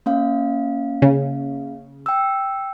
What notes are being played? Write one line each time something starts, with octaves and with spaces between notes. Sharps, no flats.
A#3 C#4 F5
C#3
G5 E6